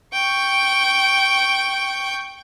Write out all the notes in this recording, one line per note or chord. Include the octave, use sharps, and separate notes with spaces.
G5 C#6